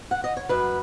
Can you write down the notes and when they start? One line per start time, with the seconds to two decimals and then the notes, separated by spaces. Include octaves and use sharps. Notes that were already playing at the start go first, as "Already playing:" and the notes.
0.11 F#5
0.24 D#5
0.37 C#5
0.49 F#2 B4